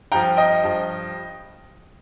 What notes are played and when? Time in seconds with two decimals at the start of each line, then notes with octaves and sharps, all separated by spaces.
0.12 G2 F3 G5 A#5
0.37 D#5 G5
0.63 G2 F3